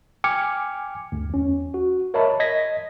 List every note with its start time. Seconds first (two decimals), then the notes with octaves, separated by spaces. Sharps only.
0.24 G5 G#5 D6 F6 G#6 C#7
1.12 D2 G2
1.30 E2 C#4
1.74 F#4
2.14 A#4 C#5 D#5 E5 A5 B5
2.40 D#5 G#6 A#6 B6